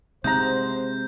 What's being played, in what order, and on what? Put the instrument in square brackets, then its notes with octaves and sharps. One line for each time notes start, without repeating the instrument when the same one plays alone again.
[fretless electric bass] C3 G#3 [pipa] D#4 F#5 A#5 [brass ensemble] C5 [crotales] G6